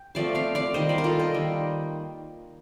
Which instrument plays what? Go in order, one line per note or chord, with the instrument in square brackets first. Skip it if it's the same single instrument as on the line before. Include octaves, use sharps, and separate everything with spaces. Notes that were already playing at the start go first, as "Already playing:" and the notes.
Already playing: [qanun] G5
F3 A3 C4 D5 F5
D5 F5
D5 F5
D#3 G3 A#3 C5 D#5
D5 F5
A#4
F4 A4
D#5 G5
D#3 G3 A#3